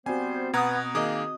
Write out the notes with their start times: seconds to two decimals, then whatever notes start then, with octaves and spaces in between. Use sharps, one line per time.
0.06 G3 B3 C4 F#4 C5 G#5
0.53 B2 B3 A#5 D#6 F#6 G#6
0.95 D#3 A#3 G#4 D#5 D6 D#6